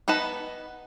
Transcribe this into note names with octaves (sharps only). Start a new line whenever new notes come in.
B3 D#4 B4 A5